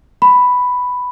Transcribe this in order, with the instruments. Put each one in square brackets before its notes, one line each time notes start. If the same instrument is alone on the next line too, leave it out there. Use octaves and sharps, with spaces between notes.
[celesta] B5